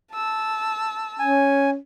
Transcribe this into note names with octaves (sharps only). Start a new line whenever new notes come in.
A5 E6
C#4 G#5